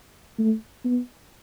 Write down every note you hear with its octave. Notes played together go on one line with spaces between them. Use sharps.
A3
B3